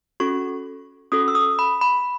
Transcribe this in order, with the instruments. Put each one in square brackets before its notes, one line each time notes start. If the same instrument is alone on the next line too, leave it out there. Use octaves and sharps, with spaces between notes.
[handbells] C#4 F#4 A4 C#6
C#4 F#4 A4 D#6
E6
D#6
B5
B5